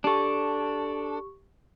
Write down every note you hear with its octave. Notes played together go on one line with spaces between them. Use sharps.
D4 G4 A4 C#6